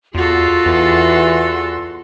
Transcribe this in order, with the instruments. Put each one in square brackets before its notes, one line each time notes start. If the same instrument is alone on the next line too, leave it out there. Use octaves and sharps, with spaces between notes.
[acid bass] E2 [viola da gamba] F4 G#4 A4 [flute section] F#4 C6
[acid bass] E2 [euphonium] E3